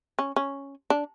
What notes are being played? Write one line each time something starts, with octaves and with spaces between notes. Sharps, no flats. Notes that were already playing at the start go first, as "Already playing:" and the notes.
C#4
C#4
D4